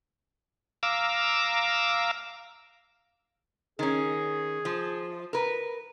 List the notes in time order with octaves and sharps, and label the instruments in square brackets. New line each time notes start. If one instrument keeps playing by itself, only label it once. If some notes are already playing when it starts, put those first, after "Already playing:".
[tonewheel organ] F5 A#5 D6 E6
[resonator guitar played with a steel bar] D#3 C#4 [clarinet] G#4
[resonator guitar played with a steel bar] F3
A#4 B4